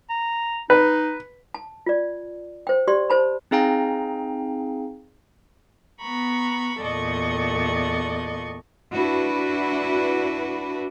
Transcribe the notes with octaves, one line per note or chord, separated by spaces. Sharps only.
A#5
D#4 B4
A5
F4 D5
C5 G5
G4 D5 C6
C5 A5 B5
C4 D#4 G#4 F5 G5 A#5
B3 A#5 B5 C#6
E2 A#2 A4 D5 D#5 C#6
D4 E4 F#4 B4